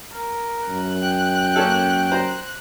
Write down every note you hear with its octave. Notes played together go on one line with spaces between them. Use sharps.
A#4
F#2 F#6
G5
A#3 C#4 A4
C5 A#5